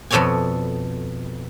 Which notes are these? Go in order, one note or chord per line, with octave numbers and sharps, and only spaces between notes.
F2 B2 A4 C#5 D5 G#5